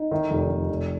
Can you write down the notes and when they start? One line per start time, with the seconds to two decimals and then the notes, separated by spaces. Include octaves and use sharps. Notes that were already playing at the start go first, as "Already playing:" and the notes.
Already playing: D#4
0.11 D#3
0.31 F1
0.50 F1
0.69 F1